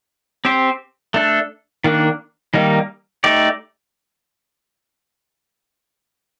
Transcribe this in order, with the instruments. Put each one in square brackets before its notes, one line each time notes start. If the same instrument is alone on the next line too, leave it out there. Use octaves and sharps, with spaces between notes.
[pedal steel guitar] C4 G4 C5
A3 D4 A4
D#3 A#3 D4
D#3 G3 A#3 D#4
A3 D#4 G4 D5